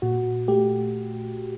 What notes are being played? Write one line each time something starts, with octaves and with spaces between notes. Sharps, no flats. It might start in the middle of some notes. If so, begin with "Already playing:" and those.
A#2 F#4
A3 G4